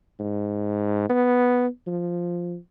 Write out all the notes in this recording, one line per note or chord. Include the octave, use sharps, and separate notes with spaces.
G#2
B3
F3